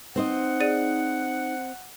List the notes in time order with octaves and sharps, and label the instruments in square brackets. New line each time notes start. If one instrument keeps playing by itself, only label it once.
[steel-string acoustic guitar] C4 C5 D#5 [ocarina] D#4 [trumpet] F#5
[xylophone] G#4 D5 D#7